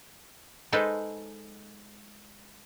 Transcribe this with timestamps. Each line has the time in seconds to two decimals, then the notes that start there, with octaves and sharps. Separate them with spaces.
0.72 G#3 D#4 A4 B4 C5